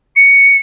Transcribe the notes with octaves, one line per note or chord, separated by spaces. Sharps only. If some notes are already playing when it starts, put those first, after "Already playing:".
C#7